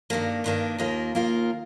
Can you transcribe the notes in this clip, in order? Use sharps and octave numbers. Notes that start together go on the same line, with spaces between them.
G2 D#3 A#3 D4
G2 D#3 A#3 D4
D#2 D#3 A#3 F4 A#4
D#2 D#3 A#3 F4 A#4